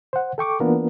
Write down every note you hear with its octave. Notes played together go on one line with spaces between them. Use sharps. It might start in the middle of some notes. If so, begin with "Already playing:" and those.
C5 F#5
A4 G5 C#6 D6
E3 A#3 B3 D4 F4 A#4